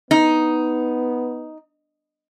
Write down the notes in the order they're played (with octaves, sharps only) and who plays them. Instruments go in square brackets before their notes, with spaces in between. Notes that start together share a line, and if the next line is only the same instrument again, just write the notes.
[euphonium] B3 [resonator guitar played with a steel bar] D#4